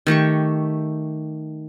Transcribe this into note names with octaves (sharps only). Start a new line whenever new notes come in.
D#3 A3 G4 C#6